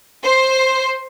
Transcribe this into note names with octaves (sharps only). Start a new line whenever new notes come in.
C5